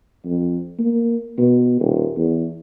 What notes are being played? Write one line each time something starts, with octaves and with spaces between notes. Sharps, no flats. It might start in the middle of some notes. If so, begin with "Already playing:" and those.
F2
A#3
B2
D#1
E2